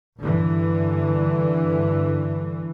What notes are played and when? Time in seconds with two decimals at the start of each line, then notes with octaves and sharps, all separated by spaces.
0.20 G2 D3 E3